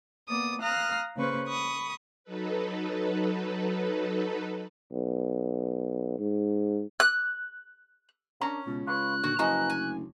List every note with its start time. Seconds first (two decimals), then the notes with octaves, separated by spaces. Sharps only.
0.28 A#3 B3 D5 D#6
0.60 F5 A#5 D#6 F6 F#6
1.16 C#3 A#3 C#4 B4 C5 C#6
1.47 B5 C#6 D#6
2.24 F#3 D#4 A4 B4
4.92 B1
6.19 G#2
7.00 F#6
8.41 C#4 D4 A#4 A#5
8.66 C#2 B2
8.87 F4 B4 C#5 F#6
9.24 A#2 D3 D#3 F#4
9.39 F#1 F3 F#4 B4 D#5 G#5 A#5
9.70 D2 G#5